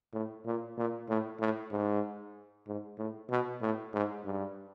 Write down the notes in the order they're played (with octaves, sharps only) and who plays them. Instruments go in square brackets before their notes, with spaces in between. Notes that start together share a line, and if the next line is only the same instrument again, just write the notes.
[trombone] A2
A#2
A#2
A2
A2
G#2
G#2
A2
B2
A2
G#2
G2